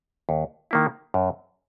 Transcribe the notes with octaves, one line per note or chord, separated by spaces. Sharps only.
D#2
D#3 A#3 E4
F#2